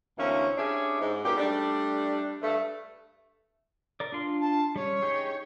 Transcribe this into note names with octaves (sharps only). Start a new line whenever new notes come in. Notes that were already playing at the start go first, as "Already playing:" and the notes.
D2 E3 A#3 C4 C#4
C#4 D4 E4 G4 G#4
G#2
F#2 A#2 B3 G4
G3 A3 D4
G2 A3
A#4 D5
D4 F4 C6
A5
G3 C#4 C#5
D#4 G4 G#4